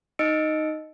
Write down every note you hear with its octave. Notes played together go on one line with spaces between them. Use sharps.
D#4 D#5 E6 C#7 D7